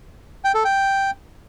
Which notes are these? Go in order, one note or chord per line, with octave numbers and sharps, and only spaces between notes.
G5
A4
G5